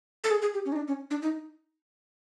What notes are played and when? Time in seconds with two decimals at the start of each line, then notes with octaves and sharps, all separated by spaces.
0.24 A4
0.31 G#4
0.42 G#4
0.54 G4
0.65 C#4
0.72 D#4
0.76 D4
0.88 C#4
1.11 D4
1.22 D#4